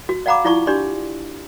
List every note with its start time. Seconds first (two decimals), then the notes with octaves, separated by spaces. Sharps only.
0.09 F#4
0.26 D5 F5 F#5 A#5 B5 D6
0.45 E4 F4 D5 A5 C#6
0.67 D4 G4 D5 C6